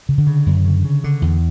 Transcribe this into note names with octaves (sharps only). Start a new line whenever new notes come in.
C#3
D3
C#3
F#2
C#3
C#3
D3
E2